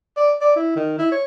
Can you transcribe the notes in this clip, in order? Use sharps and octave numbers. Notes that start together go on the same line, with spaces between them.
D5
D5
E4
D#3
E4
C#5